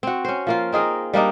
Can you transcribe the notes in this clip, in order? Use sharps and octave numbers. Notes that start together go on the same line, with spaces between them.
C4 F#4
C#4 C5
F3 A#3 F4
C4 D#4 G#4 A#4
G3 A#3 D4 D#4